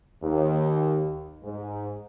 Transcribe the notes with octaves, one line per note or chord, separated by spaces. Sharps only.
D#2
G#2